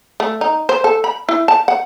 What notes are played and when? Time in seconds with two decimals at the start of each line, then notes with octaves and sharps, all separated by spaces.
0.20 A3
0.41 D#4
0.69 C5
0.84 A4
1.04 B5
1.29 E4
1.48 A5
1.68 F#5